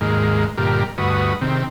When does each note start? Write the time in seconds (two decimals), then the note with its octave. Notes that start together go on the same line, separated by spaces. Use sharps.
0.01 D#2 G#2 G#3 A#3
0.57 G2 A#2 D3 G4 A#4
0.98 D2 G2 F#4 B4 D#6
1.41 C3 D#3 C4